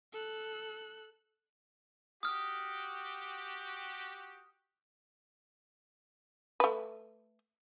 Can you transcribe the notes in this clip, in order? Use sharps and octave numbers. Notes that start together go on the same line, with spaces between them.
A4 F#6
F#4 G4 D#6 F6
A3 B4